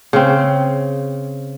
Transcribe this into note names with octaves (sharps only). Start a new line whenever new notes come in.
C#3 C4